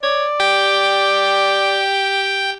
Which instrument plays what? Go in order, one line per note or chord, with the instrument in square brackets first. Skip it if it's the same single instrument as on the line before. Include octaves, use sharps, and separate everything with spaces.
[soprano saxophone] C#5 [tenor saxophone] D5
[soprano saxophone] G4 [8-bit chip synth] G5